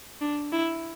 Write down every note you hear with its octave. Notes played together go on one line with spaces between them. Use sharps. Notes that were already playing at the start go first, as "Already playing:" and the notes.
D4
E4